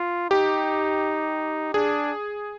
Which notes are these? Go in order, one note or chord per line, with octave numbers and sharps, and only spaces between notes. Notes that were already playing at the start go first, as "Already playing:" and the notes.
Already playing: F4
D#4 G4
D4 G#4